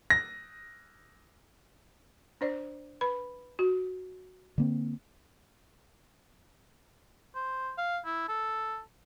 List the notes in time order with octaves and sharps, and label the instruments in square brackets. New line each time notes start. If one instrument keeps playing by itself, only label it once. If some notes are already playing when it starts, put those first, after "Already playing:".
[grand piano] A#6
[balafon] D4 C5 D5
B4 B5
F#4
[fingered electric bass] D3 A#3 C4
[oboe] C5
F5
E4
A4